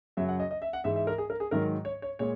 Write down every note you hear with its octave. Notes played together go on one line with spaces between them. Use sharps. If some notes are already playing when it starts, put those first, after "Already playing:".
F#2 C#3 F#3 E5
F#5
D#5
D#5
E5
F#5
G#2 E3 G#3 E5
E5
A#4
G#4
A#4
G#4
G#2 D#3 F#3 A#4
C#5
C#5
A#2 G#3 C#5